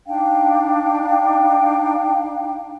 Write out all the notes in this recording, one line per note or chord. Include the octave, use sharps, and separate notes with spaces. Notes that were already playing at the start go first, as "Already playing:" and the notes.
D4 D#4 F5 G5